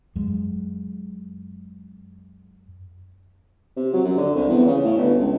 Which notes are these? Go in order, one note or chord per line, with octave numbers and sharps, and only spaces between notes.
F#2 G#3
C3
F#3
F#2
D3
C2
E2
C#3
A2
G1
C#2